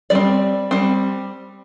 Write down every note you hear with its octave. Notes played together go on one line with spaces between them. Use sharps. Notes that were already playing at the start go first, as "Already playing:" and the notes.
G3 C4 D5
G3 C4